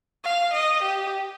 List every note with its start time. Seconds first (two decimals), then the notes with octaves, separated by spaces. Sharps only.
0.24 F5
0.53 D#5
0.82 G4